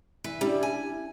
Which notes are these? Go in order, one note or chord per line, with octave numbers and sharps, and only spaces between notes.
E3 B4
G3 C#4 D4 E4
G#5